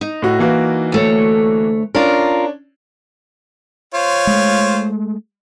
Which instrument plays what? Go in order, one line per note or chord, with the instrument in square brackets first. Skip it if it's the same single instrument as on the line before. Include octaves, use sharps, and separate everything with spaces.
[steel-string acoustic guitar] D#4
[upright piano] A2 F#4
E3 A#3 F#4
[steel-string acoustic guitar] D2 A3 C#5
[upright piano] C#4 D4 [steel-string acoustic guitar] F4 A#4
[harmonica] F4 C5 C#5
[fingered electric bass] G#3 A3